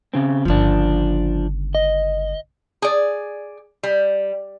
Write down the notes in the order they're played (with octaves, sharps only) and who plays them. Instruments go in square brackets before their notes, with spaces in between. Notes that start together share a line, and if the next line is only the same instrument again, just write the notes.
[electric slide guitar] C#3 C4
[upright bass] G1 C#3 [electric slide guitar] F3 D4
[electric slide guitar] D#5
[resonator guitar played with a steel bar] G#4 D5
G3